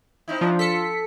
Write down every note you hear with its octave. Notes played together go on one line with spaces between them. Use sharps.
C4 D#4 E4
F3 D4 F4
A4 B6 C#7